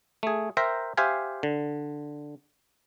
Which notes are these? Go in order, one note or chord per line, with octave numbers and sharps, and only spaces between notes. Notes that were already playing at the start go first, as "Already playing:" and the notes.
A3 G#4
A#4 C5 E5 G5 A#5
G4 C5 E5 F5 G#5
D3